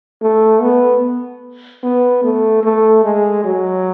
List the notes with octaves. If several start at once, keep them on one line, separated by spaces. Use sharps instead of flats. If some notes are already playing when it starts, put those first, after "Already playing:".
A3
B3
B3
A3
A3
G#3
F#3